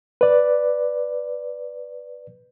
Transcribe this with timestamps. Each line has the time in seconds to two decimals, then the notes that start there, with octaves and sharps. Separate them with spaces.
0.21 B4 D5